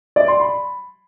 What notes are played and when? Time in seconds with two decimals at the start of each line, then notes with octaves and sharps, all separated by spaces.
0.16 D5
0.28 C6
0.40 B5